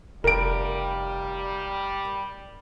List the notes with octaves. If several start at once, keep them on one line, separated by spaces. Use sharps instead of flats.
F1 G3 A#4 D7